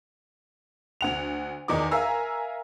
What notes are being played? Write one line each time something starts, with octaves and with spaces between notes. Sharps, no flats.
D2 F#5 F7
E2 D#3 D#4 D5 D6
A#4 E5 F5 G#5 A#5 E6